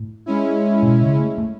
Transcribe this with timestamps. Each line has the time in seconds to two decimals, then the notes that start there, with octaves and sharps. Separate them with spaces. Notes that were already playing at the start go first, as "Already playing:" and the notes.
Already playing: A2
0.26 G#3 C#4 E4
0.83 B2
1.01 C#3
1.19 A3
1.38 A3